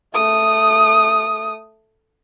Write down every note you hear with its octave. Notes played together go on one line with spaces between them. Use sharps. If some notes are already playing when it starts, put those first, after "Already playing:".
A3 D#6